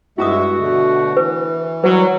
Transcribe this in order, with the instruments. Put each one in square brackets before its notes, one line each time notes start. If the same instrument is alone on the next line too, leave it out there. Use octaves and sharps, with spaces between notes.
[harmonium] G2 G#3 E5 [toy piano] E4 A#5 D#6 [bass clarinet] F#4
[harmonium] B2 D3 A3
[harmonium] E3 [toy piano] B4
[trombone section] F#3 [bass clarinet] G3 [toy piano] B4